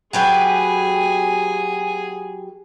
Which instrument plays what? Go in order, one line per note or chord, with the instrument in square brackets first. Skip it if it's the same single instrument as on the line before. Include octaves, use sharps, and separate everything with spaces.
[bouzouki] F#3 G4 B4 [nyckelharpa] G#4 G#5